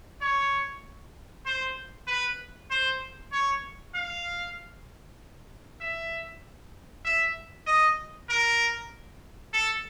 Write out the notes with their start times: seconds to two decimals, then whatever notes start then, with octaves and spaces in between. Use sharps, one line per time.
0.21 C#5
1.46 C5
2.08 B4
2.71 C5
3.32 C#5
3.95 F5
5.81 E5
7.05 E5
7.67 D#5
8.29 A#4
9.54 A4